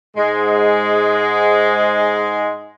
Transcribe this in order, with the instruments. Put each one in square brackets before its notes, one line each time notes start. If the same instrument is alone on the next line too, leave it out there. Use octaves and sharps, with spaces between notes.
[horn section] G#2 G#3